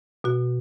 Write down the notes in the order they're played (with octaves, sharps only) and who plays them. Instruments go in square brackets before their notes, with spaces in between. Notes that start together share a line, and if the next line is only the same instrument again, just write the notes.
[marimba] B2 F#4